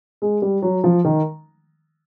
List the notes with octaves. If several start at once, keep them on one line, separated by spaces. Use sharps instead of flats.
G#3
G3
F#3
F3
D#3